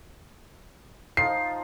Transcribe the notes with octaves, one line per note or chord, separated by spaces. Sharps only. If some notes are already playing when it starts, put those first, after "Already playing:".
F3 D#4 F4 C7